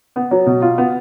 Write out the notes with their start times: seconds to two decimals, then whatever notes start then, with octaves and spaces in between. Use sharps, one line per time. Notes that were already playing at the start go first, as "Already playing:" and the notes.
0.16 B3
0.31 F#3
0.46 B2
0.62 F4
0.78 B3